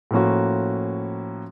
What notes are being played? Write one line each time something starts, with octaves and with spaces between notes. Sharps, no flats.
A2 F3 A#3 C#4 F#4